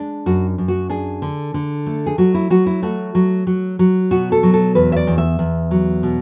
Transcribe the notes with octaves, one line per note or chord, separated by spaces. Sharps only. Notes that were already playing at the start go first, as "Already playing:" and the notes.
Already playing: G#3 D4
F#2 F#4
F#2
F#4
D4 G#4
D3
D3
A3
G#4
F#3 F#4
E4
F#3 F#4
E4
A3 F#4
F#3
F#3
F#3
B2 F#4
A4
F#3
A4
E2 B4
E5
D5
E2
E5
E2
F#3
B2